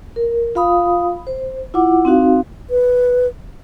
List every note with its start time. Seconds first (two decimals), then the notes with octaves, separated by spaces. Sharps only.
0.16 A#4
0.55 F4 F5 B5 D#6
1.27 C5
1.74 E4 F4 F#5 D6
2.05 C4 D#4 F#4 F5
2.70 B4